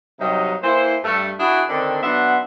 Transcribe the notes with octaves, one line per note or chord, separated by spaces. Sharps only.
G2 C3 F#3 D#4
E3 A#3 E4 C5
G2 A3
D4 E4 F#4 G#4
D3 D#3 C4 D4
F#3 B3 D4 E5 F#5 C6